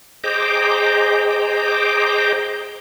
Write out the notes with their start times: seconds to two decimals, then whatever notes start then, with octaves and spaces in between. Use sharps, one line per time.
0.24 G#4 C5 D#5 G5 A#5 D6